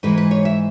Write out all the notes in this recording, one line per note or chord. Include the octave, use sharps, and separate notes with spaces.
G#2 E3 G#3 B4
B4
C#5
E5